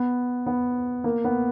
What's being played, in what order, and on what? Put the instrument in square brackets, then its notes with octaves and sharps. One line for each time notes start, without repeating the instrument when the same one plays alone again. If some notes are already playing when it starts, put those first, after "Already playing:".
Already playing: [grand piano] B3
B3
A#3
B3